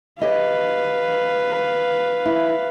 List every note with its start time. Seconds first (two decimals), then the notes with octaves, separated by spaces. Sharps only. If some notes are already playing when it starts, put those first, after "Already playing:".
0.22 G4 B4 C#5 D#5 F5
2.26 E4